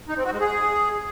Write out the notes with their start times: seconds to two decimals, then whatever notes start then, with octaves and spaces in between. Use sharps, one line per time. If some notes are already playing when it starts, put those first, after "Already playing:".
0.09 D#4
0.17 C4
0.25 F#4
0.33 G#3
0.41 G#4